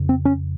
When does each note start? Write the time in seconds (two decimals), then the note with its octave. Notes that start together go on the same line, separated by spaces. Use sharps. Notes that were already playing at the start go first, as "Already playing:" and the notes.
Already playing: F2 C#3
0.09 C4
0.25 C#4